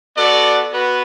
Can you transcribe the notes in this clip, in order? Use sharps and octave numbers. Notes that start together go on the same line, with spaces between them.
B3 F#4 A4 D5
B3 F#4 B4